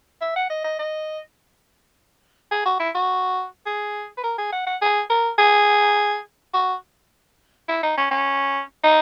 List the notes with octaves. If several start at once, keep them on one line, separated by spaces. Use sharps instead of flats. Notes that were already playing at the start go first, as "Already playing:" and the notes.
E5
F#5
D#5
D#5
D#5
G#4
F#4
E4
F#4
G#4
B4
A#4
G#4
F#5
F#5
G#4
A#4
G#4
F#4
E4
D#4
C#4
C#4
D#4